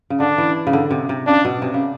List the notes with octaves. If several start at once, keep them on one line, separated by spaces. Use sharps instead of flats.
C#3
D3 D4
E3
C#3
D3
C3
C3
C#3 D4
B2
C3
C#3